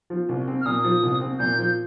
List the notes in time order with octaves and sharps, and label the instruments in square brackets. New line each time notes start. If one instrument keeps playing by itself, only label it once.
[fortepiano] F3
C2
C4
[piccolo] F6
[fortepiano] A#2 [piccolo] D#6
[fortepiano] F3
C2
C4
[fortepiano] A#2 [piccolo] G6
[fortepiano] F3